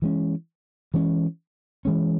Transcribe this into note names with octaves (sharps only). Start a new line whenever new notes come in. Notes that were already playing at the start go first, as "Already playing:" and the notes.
E3 G#3 C#4
E3 G#3 C#4
E3 G#3 C#4